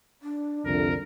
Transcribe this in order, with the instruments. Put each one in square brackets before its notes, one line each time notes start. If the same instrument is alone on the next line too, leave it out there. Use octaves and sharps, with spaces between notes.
[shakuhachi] D4
[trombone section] C2 F2 [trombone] D3 [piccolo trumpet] A#4